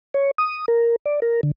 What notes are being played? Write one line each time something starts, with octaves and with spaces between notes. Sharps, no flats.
C#5
D#6
A#4
D5
A#4
D3